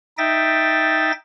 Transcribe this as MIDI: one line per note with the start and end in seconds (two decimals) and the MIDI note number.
0.18 1.12 63
0.18 1.12 76
0.18 1.12 79
0.18 1.12 93
0.18 1.12 94